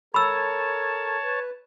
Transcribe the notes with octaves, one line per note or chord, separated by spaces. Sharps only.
A4 A#4 C#5 A5 B5 E6
B4